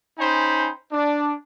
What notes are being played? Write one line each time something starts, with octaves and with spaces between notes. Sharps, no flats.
C#4 D#4 C5 G5 G#5 B5
D4